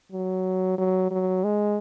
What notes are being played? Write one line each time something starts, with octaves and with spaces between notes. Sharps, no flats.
F#3
F#3
F#3
G#3